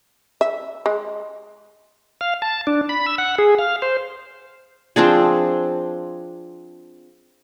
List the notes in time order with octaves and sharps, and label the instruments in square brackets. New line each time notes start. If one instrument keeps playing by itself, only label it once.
[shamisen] E5
G#3
[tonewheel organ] F5
A5
D4
B5
E6
F#5
G#4
F5
C5
[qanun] F3 C4 D4 G#4